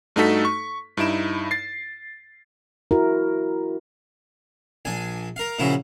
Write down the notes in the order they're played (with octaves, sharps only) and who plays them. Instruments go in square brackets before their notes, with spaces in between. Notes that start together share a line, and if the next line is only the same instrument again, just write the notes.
[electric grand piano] G2 A3 D#4 F#4 A4 B6
C#6
G2 D#4 E4 D7 E7
A6 C7
[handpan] E4 F#4 A#4
[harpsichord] A#1 D4 G#5
A#4 F5
A#2 C#3 F3 E4 F#4